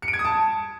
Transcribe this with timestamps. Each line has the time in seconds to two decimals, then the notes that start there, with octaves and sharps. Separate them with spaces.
0.02 C#7
0.08 D7
0.13 G#6
0.19 D#6
0.25 A5